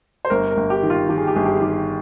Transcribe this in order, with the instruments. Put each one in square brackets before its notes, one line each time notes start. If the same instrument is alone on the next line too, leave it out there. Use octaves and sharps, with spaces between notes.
[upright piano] C5
[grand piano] G1 [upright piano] A#4
[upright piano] A#4
[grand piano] G1
[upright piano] G4
[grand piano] D#3
[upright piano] F4
[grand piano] D#3 [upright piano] G4
[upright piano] G#4
G4
[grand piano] G1 [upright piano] G#4
[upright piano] G4
G#4
[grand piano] D#3 [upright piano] G4